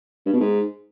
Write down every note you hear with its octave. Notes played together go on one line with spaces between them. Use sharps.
G2
B2
G#2